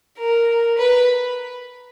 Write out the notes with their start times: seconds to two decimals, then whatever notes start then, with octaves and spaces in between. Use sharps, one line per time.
0.19 A#4
0.78 B4